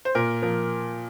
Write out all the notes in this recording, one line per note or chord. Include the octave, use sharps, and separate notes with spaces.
C5
A#2 A#4
F3 A#4